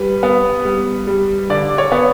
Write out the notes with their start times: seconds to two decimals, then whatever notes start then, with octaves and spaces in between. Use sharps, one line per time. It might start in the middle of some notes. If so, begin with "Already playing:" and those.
Already playing: G3 B4
0.23 B3
0.65 G3
1.07 G3
1.50 D3 D5
1.78 C#5
1.92 B3